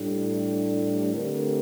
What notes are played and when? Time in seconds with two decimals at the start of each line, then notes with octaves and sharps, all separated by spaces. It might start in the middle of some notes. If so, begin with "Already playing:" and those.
Already playing: A2 G3 D4
1.13 D3 A3 C4 G4 A#4